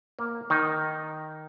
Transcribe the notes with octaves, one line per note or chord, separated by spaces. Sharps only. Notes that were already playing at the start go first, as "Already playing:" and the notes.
A#3
D#3 D#4